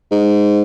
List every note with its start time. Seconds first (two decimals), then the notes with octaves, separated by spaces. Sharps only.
0.11 G#2